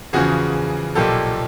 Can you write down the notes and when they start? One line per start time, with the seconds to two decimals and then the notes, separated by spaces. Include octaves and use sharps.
0.13 E2 C#3 F3 F#4 G#4
0.95 B1 A#2 F3 G4 A4